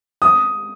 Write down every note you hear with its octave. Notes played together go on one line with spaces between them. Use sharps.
D#6